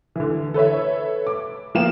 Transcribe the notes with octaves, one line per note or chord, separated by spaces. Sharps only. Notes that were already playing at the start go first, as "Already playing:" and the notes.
D3 E3
A4 B4 C#5 E5
D6
F3 A#3 B3 F5 G5 E7